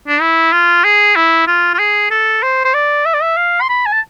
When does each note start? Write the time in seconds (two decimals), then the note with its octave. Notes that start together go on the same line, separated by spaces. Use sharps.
0.08 D4
0.21 E4
0.53 F4
0.84 G#4
1.16 E4
1.47 F4
1.74 F4
1.79 G#4
2.11 A4
2.43 C5
2.65 C5
2.74 D5
3.06 E5
3.14 D5
3.22 E5
3.37 F5
3.62 C6
3.69 B5
3.86 G#5
3.93 A5